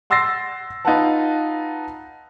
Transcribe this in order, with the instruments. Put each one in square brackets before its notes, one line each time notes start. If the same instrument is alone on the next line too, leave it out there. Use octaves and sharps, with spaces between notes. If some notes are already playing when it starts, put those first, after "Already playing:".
[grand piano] F#5 C6 E6 A6 A#6 C7
D#4 F4 B4 F5 F#5 A5